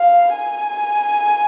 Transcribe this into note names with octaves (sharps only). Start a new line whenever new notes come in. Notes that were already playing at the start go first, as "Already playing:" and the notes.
Already playing: F5
G#5